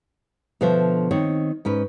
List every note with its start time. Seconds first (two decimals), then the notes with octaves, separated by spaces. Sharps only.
0.61 B2 D3 F3 C5 E5
1.11 D#3 C4 C#5
1.65 G#2 C#4 B4